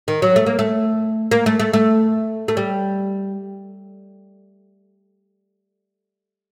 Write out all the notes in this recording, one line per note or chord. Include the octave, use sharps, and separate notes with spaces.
D#3
F#3
A3
A#3
A3
A#3
A3
A3
A3
A3
G3